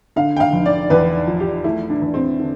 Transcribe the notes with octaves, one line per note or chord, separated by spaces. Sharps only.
D3 F5
G5
F5
F1
D5
E2 B4
F3
G4
A3 E4
D4
E2
C4
D3